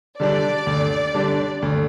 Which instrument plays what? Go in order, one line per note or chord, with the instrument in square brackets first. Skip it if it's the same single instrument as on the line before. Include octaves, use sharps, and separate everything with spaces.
[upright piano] D3 G3 D4 [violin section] D5
[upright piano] D2
D3 G3 D4
D2